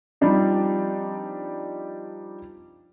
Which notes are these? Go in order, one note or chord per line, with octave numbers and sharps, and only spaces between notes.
F3 G3 C4 D4 D#4 G4